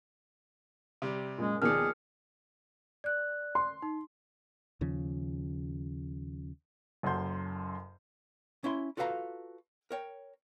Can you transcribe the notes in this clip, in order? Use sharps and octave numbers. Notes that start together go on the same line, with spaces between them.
C3 G3
F#2 A#2 G#3
D#2 B2 D#3 F3 G#4 D5 F6 C#7
D5 F#6
C6
D#4
D#2 C#3 F3
F#1 F#2 A4 F#5 C6 G6
C#4 E4 E5 C6
F4 F#4 A4 B4 F5 A#5
A#4 C#5 G5